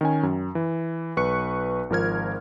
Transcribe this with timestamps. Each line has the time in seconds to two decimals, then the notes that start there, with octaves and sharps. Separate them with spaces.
0.01 D#3 C#4 G#5
0.23 F#2
0.55 E3
1.17 B1 B4 C#6 F#6 C#7
1.90 G#1 F3 A#4 F6 G#6